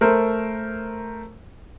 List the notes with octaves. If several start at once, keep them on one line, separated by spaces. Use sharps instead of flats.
A3 A#4 C5